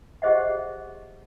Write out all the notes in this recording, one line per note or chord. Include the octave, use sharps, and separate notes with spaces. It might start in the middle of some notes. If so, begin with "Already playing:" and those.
G4 G#4 C5 D#5 E5 F#5